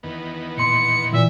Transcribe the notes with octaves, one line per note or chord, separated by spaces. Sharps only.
E2 D#3 B3
A#2 C6 C#7
A#2 E3 E5